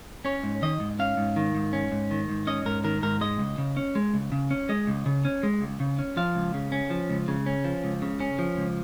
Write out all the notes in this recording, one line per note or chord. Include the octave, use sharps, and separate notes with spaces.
C#4 C#5
G#2
D#3 D#5
G#2
C#4 F5
G#2
D#3
G#2
C#4
G#2
D#3
G#2
C#4 D#5
G#2 A#4
D#3 A#4
G#2 A#4
G#3 D#5
C#2
C#3
C#4
G#3
C#2
C#3
C#4
G#3 D#5
C#2
C#3
C#4
G#3
C#2
C#3
C#4
F3 F5
C#2
C#3
C#4
F3
C#2
C#3
C#4
F3
C#2
C#3
C#4
F3
C#2